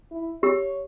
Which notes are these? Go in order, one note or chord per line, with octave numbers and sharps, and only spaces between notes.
E4
G4 C#5